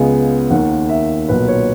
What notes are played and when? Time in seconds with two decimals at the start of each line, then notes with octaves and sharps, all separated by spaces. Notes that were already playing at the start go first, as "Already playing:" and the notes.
Already playing: C#2 C#3 G#3 B3 G#5
0.50 D#2 D#3 A#3 F#5
0.89 E5
1.29 B1 A#2 F#3 B4
1.48 C#5